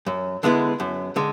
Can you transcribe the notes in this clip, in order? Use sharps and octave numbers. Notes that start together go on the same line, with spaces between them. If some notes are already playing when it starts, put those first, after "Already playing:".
F#2
D3 G#3 B3 E4
F#2
D3 G#3